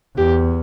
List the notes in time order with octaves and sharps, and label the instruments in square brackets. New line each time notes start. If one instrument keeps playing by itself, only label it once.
[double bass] E2 [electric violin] G4